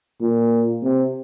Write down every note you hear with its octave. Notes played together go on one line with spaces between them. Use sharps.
A#2
C3